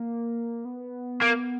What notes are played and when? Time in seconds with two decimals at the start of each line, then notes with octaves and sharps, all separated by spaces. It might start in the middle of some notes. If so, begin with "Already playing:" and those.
Already playing: A#3
0.65 B3
1.21 A#3